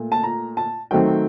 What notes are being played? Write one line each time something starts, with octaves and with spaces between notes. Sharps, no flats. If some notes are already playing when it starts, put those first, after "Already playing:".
Already playing: A#2 A3
A5
A#5
A5
D#3 F#3 A3 C4 G5